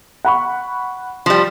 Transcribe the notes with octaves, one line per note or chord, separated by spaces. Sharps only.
F#5 B5 C#6
F3 G3